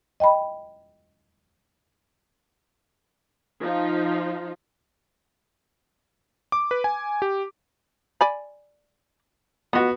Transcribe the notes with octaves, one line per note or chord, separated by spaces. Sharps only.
D#5 G5 A5 B5
F3 D#4 F4
D6
B4
G#5
G4
D5 G#5 B5
B3 F4 F#4 D#5